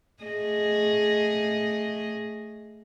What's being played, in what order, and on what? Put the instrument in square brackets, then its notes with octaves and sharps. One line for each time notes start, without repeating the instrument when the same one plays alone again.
[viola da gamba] A3 G#4 D#5